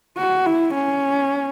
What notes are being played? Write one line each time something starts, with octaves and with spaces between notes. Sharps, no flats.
F#4
E4
C#4